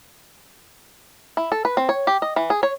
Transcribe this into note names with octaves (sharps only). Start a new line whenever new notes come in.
E4
A4
B4
C4
C#5
G4
D#5
E3
G#4
C#5